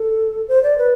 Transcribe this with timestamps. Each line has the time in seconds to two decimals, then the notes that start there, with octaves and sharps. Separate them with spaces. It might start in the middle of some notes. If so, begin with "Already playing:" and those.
Already playing: A4
0.48 C5
0.63 D5
0.78 B4